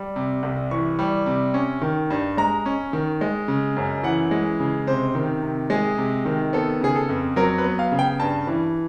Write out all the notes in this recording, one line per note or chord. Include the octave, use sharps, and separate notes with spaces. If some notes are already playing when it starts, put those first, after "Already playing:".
Already playing: G3
C3
C2
E3 C#6
G3
C3
C#4
D#3
G2
G#3 A#5
C#4
D#3
G#3
C#3
F#2
E3 F#5
G#3
C#3
C3 C5
D#3
C3
G#3 G#4
C3
D#3
B3 A4
C#3 G#4
A4
F2
F#3 A#4
B4
B3
F5
C#3
G5
G2 A5
E3